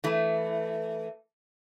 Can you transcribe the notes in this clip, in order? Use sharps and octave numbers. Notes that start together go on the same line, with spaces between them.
E3 A3